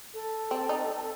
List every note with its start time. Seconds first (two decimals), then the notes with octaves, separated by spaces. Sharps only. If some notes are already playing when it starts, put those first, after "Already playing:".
0.14 A4
0.51 C4
0.69 D#4